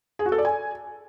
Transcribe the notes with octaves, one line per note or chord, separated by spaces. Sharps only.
G#4
F#4
A4
D5
G#5